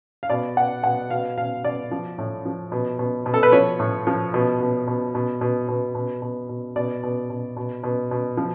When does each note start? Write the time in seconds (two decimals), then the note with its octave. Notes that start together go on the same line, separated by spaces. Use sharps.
0.23 F5
0.30 B2 D5
0.57 B2 F#5
0.84 B2 F#5
1.10 B2 F5
1.37 B2 F5
1.64 B2 D5
1.91 F3
2.18 A2
2.45 F3
2.72 B2
2.99 B2
3.26 B2
3.34 A4
3.43 B4
3.52 F3 C#5
3.79 A2
4.07 F3
4.34 B2
4.60 B2
4.87 B2
5.15 B2
5.41 B2
5.68 B2
5.95 B2
6.22 B2
6.49 B2
6.76 B2 D5
7.03 B2
7.30 B2
7.57 B2
7.83 B2
8.11 B2
8.37 F3